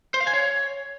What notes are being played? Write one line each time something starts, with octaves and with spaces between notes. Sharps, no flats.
C5
F5
G#5
C#5